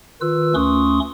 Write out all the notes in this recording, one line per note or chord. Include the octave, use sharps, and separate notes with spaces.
D#3 F4 B4 E6
D2 A3 C#4 C6 C#6 D#6